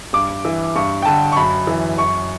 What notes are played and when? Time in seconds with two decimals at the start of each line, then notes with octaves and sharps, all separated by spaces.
0.13 G2 D6
0.45 E3
0.76 G2 C#6
1.03 G5
1.05 D3 A5
1.32 C#6
1.37 F#2 B5
1.67 E3
1.98 F#2 C#6